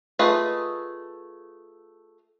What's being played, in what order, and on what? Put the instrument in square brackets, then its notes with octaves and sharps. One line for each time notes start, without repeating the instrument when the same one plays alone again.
[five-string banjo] A3 F4 G#4 B4 D#5